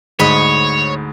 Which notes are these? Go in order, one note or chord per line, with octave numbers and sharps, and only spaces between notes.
D2 G#2 C#5 D#5 B5